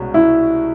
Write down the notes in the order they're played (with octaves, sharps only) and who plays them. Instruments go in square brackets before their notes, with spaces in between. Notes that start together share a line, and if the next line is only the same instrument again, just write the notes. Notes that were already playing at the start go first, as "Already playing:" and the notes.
Already playing: [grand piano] C2 B2 G#3 C#4
[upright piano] E4